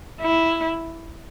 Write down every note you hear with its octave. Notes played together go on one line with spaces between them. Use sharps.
E4